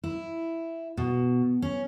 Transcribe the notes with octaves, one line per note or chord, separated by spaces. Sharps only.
E4
B2
C#4